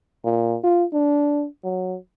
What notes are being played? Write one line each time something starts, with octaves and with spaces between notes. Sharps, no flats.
A#2
F4
D4
F#3